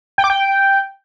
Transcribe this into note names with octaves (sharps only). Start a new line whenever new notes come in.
G5
D6
G5